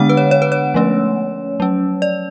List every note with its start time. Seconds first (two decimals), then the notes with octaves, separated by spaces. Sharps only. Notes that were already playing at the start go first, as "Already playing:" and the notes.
Already playing: D3 G#3 B3 D4 F#5
0.09 B4
0.17 C#5
0.31 C#5
0.42 B4
0.52 C#5
0.74 F3 A3 C#4
1.60 F#3 C#4
2.02 D5